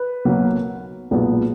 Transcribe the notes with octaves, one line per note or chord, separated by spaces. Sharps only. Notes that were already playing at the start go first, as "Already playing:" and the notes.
Already playing: B4
B1 B2 F#3 A#3
B1 A#2 G#3 B3